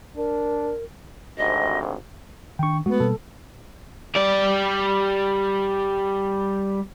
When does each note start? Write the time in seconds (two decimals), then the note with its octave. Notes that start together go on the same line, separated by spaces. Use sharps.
0.17 D4 A#4
1.38 G#1 D2 C3 D#5
2.59 D#3 D4 G5 C#6
2.86 G#3 A3 B3 F#4
3.00 B2 G3 A#3 A4
4.15 G3 D5